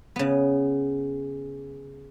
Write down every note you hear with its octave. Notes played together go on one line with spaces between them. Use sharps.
C#3 B3